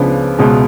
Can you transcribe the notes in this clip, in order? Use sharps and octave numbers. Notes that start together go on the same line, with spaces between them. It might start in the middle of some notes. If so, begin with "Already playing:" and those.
Already playing: C#2 C#3 F3 B3 D4
C#2 B2 G#3